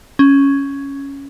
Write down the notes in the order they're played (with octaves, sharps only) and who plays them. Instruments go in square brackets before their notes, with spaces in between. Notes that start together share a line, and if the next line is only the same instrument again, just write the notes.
[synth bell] C#4